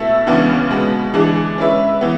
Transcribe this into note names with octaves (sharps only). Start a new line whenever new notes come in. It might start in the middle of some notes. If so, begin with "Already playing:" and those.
Already playing: B2 A3 E4 A4 E5
C#2 C#3 E3 B3 D4
B2 G#3 B3
E3 G#3 D4 G#4
G#3 C#4 E4 B4 E5
E3 B3